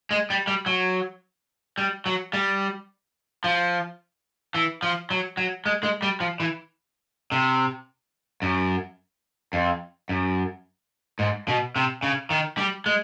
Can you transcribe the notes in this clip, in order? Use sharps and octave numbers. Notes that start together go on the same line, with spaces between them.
G#3
G3
G3
F#3
G3
F#3
G3
F3
E3
F3
F#3
F#3
G#3
G#3
G3
F3
E3
C3
F#2
F2
F#2
G#2
B2
C3
C#3
D#3
G3
G#3